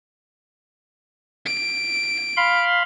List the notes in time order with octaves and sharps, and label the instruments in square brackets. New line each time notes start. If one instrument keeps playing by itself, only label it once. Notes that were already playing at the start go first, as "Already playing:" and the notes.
[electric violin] D7
[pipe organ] F5 B5 C6